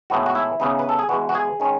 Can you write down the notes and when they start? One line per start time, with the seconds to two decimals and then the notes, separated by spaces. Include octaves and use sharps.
0.10 A2 E3 G#3 B3 D#4 F#4
0.26 F#4
0.35 E4
0.60 C#3 E3 B3 D#4
0.79 B4
0.89 A4
0.99 G#4
1.09 E2 B2 G#3 F#4
1.29 F#4
1.35 G#4
1.60 D#3 G#3 C#4